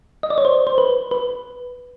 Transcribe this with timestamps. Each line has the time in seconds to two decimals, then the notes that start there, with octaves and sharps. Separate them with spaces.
0.23 D#5
0.30 D5
0.38 C#5
0.45 C5
0.67 C5
0.78 B4
1.11 B4